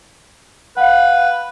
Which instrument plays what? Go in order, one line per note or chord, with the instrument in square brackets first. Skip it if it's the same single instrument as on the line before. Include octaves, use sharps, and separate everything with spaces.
[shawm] B4 [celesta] F5 F#5